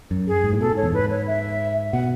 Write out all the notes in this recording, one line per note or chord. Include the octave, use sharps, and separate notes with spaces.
F#2
G#4
G#2
A2
B2 A4
G#2 C#5
E2
G#2 B4
C#5
E5
B2 F#5